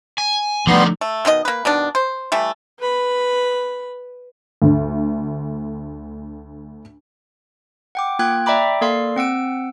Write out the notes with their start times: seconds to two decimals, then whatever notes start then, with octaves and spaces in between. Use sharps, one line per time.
0.18 G#5
0.67 D3 F3 G3 A3 B3 D#4 C6
1.01 A3
1.25 B2 D#3 E4 D#5
1.45 A#3 B4
1.65 B2 D#3 D4
1.95 C5
2.32 E3 G3 A3
2.79 B4 B5
4.62 D2 D3
7.95 F#5 G5 D6
8.19 A#3 F4 G5 F#6 G#6
8.46 D5 E5 G5 A#5 B5 D6
8.81 A#3 A4 D5 F5 C6 C7
9.16 C4 F#5 E6 D7